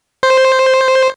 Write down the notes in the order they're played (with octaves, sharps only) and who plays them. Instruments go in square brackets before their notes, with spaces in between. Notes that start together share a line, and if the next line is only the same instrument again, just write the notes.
[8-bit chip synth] C5